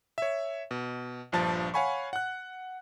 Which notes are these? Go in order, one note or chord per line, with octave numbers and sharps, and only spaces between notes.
C#5 E5
B2
A#1 G2 F3 A5 A6
C#5 F5 F#5 G#5 B5 C#6
F#5 F#6